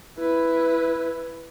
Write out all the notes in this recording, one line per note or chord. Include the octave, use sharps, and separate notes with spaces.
E4 B4